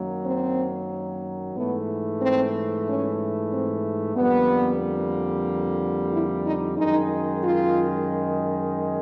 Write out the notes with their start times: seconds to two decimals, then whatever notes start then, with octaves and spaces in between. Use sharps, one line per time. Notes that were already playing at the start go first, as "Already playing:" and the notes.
Already playing: F#2 D#3 F#3 A#3
0.25 C4
1.55 G#2 E3 A3 B3
2.20 C4
2.86 C#4
3.50 C4
4.15 F2 D3 G3 A#3 B3
6.11 E4
6.45 D#4
6.77 F#2 D#3 G#3 D#4
7.42 F4